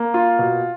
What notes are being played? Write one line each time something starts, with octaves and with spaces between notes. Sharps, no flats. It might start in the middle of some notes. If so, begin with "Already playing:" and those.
Already playing: A#3
F4
B2